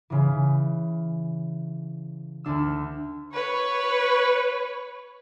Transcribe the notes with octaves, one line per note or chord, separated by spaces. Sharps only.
C#3 E3
D2 D4 E6
B4 C#5